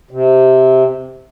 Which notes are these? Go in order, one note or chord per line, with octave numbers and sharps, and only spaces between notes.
C3